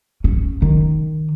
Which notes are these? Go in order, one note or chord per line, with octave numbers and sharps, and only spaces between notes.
C#4
D#3